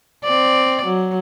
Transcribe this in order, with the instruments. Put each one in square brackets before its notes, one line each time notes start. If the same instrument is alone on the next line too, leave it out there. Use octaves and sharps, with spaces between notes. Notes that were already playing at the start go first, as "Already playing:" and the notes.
[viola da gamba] C4 D5
F#3